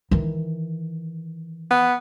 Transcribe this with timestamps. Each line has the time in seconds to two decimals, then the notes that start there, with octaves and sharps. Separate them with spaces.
0.11 D#3 E3
1.70 B3